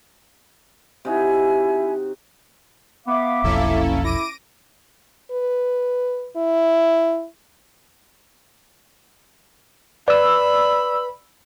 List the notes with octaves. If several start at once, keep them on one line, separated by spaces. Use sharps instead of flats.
C3 D#4 E4 F#4 E5 G#5
B3 E5 F5 D6
F1 B1 F2 A#3 C#4 E4 A4
E4 D6 A#6 D7 D#7
B4
E4
B4 D5 B5 E6